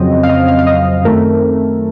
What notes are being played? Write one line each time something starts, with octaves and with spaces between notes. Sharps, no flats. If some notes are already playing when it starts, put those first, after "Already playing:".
Already playing: F2 C#3 F#3 C4 D#5
F5
D#5
F5
F5
D#5
F#2 D#3 A3 C4 A#4